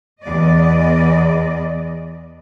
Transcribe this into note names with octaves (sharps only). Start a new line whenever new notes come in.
E2 D5 D#5